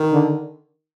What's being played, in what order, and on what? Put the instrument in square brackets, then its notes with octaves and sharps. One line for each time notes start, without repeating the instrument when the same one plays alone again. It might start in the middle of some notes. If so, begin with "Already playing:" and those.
Already playing: [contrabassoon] D#3
[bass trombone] D3